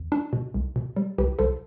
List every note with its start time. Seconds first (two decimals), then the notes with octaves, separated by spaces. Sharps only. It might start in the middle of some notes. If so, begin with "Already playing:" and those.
Already playing: E2
0.12 D4
0.33 B2
0.54 C2
0.76 B2
0.96 G3
1.18 C2 G4 B4
1.39 C2 A4 C5